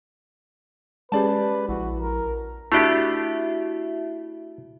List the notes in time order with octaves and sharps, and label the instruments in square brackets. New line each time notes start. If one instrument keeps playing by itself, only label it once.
[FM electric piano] G#3 C#4 G4 [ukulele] G#4 D5 A5 [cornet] B4
[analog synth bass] A#1 [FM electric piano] E4 [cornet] F#4
[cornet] A#4
[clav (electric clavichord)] A3 D4 G4 [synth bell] E4 F#4 E5